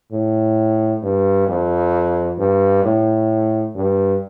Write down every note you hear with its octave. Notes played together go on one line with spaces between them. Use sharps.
A2
G2
F2
G2
A2
G2